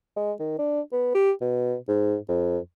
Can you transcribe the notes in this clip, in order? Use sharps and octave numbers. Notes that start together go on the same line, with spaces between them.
G#3
D#3
D4
B3
G4
B2
G#2
F2